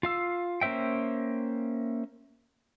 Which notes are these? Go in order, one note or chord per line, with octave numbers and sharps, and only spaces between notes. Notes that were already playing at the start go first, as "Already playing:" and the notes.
F4 F5 E6
A#3 C#4 C5 E5 G5